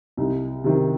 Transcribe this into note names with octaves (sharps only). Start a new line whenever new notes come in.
C2 D#4
C3 D#3